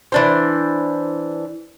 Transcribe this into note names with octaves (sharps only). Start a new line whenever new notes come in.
E3 D4 C5